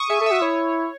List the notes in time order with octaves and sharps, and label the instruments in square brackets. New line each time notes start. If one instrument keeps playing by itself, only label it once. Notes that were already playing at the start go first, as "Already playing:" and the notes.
Already playing: [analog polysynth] C#6 D#6
[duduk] G#4 [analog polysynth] E5
[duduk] A4
[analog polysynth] E5
[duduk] F#4
[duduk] E4 [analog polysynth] C#5